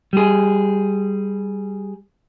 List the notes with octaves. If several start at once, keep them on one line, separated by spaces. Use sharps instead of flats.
G3 G#4